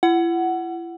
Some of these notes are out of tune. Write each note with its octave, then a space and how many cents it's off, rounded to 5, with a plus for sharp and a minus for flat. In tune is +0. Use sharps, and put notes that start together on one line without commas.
E4 +40 F#5 +10